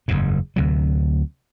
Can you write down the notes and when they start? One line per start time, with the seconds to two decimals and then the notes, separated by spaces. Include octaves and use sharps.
0.08 F#1 E2 G#2
0.56 D2 C3 F#3